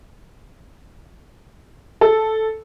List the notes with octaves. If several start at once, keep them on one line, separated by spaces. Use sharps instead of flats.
A4